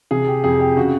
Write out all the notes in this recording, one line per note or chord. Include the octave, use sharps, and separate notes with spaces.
C3 G#4
G4
F2 G#4
G4
C#3 F#4